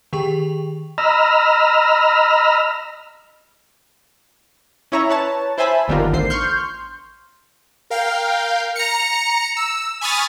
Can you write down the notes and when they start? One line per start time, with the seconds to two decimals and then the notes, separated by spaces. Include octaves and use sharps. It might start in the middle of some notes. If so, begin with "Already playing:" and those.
0.13 D#3 G4 G#4 G5 C#6
0.98 D#5 A#5 B5 E6 F6
4.92 C#4 E4 C#5 E5 A#5
5.10 B4 C#5 A5
5.58 E4 C5 E5 G#5 A5 B5
5.88 G1 D#3 G3 B3 F4 A#4
6.13 A1 D3 C5 C7
6.30 C6 C#6 F6 G6
7.90 A#4 F5 G5
8.76 A#5 C#7
9.57 E6
10.01 G#5 B5 C#6 D#6 F6 A6